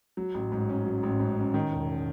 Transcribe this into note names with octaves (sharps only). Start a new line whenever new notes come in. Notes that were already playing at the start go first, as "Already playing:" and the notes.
F#3
A1
G#2
C#4
F#3
A1
G#2
C#4
D#3
E1